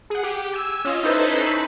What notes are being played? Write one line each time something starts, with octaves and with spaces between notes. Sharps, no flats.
G#4 F#5
G4
G#5 E6
C#4 F4 D#5
C#4 D#4 E4 A4 B4 C5
B5